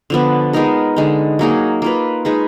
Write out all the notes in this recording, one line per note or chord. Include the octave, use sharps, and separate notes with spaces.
D3 F3 B3 D4
G#3 B3 D#4 A#4
D3 G#3 D#4
F#3 A#3 D#4 G#4
A#3 F4 B4
G#3 D#4 G#4 B4